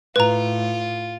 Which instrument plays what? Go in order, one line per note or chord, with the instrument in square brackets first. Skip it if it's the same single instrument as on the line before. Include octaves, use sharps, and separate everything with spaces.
[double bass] A2 [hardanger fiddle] F4 [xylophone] B4 A#5